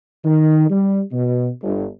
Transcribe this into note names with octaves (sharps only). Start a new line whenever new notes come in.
D#3
G3
B2
G1